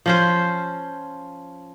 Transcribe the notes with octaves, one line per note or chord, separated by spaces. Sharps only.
F3 C#4 C5